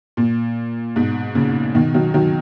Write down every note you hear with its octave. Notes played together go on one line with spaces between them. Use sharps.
A#2
G#2 B2
A#2 C#3
B2 D#3
D#3 F#3
D#3 F#3